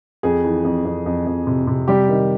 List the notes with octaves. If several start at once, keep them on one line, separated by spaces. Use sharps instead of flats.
F2 G#4
E3
F2
F2
F2
F2
C3
C3
G3 G4
D#3